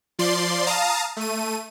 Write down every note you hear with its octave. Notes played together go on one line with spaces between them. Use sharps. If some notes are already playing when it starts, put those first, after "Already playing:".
F3 D5 C6
F5 A5 A#5 D#6
A3 D#7